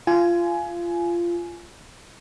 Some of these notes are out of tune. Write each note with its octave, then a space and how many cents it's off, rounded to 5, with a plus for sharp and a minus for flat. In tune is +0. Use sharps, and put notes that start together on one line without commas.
F4 -20 G#5 +15